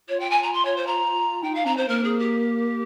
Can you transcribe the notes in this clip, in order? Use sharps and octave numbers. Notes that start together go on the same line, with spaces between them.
F4 C#5
G5
G#5
A#5
C6
C#5
C5
A#5
D#4 G5
F5
C4 A#5
C5
A#3 A#4
G#4
G4